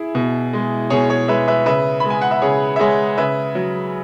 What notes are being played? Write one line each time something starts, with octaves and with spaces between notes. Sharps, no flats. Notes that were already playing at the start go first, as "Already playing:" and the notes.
Already playing: E4 G#4
B2
G#3
B2 G#4 C#5
G#4 C#5
G#3 B4 E5
B4 E5
C#3 B4 E5
G#3 B5
G#5
F#5
E5
C#3 G#4 C#5
E5
G#3 G#4 C#5
C#3 B4 E5
F#3